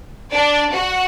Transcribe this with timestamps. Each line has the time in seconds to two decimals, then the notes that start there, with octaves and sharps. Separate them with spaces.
0.32 D4 D5
0.72 F#4 F#5